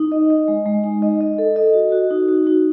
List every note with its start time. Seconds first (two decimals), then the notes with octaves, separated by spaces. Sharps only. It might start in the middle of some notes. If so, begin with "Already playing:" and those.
Already playing: D#4
0.12 D#5
0.30 D#5
0.48 G#3
0.66 G#3
0.84 D#4
1.02 D#5
1.21 D#5
1.38 A4
1.56 D#5
1.74 F#4
1.92 F#4
2.11 D#4
2.28 F#4
2.47 D#4